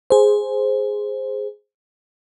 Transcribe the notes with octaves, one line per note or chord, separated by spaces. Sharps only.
G#4 C5